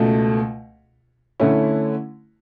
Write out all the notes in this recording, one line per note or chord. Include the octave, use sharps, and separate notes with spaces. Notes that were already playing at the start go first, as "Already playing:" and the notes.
Already playing: C#2 B2 A3
D3 A3 C#4 E4